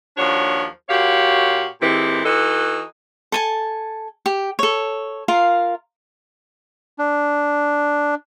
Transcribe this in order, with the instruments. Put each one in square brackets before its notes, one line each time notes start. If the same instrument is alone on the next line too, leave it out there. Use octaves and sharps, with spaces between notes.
[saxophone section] D#2 F3 D4 F#4 C#5
A#2 F#4 G4 C#5 F5
A#2 E3 G#3 C4 G4
E3 D#4 F#4 A4
[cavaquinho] A4 G#5 A5
G4
A4 C#5
F4 A#4 F5
[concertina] D4